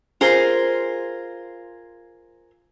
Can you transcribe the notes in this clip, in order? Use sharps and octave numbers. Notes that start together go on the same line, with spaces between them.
F4 G#4 A#4 C5